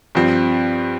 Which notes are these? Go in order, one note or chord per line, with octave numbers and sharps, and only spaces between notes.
G2 F3 C4